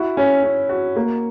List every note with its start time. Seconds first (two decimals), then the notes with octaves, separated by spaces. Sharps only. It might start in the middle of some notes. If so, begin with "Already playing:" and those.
Already playing: E4 F#4
0.17 C#4
0.44 C#4
0.69 F#4
0.96 A#3